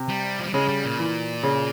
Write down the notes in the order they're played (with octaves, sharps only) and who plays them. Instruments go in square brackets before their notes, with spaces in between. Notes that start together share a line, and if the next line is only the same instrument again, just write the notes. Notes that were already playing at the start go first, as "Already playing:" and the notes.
Already playing: [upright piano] C3
[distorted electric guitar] G3
F3
G3
[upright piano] C#3 [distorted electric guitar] G#3
[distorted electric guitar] G3
A#2
[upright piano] E3
C#3